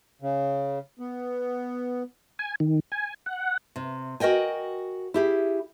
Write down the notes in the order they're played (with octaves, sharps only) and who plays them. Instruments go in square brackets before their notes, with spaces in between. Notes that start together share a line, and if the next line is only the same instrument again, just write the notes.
[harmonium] C#3
B3
[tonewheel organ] G#5
D#3
G#5
F#5
[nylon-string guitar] C3
F#4 A#4 D#5 G5 G#5
E4 G4 G#4